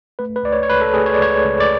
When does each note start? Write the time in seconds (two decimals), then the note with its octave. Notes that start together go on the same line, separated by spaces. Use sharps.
0.19 A3 B4
0.36 B4
0.43 C#2 D5
0.53 C#5
0.63 C#5
0.69 C#2 B4
0.81 A4
0.93 A3 G#4
1.06 C#5
1.14 D5
1.19 C#2 C#5
1.44 C#2
1.60 D5